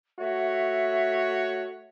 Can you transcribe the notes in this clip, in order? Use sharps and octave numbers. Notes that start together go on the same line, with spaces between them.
A3 F#4 C#5 E5